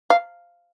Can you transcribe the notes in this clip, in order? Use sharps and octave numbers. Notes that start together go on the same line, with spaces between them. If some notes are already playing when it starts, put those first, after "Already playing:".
F5